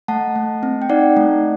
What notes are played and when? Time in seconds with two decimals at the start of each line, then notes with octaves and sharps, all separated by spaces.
0.08 A3 F#5 A5
0.36 A3
0.63 C4
0.82 G5
0.89 D#4 D5 F#5
1.17 A3